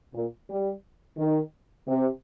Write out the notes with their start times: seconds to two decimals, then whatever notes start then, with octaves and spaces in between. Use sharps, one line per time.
0.14 A#2
0.50 G3
1.18 D#3
1.88 C3